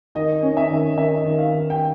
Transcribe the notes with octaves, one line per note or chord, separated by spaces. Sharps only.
D#3 D#5
C#4
E5
D#3
D#3 E5
D#3
F5
D#3
G5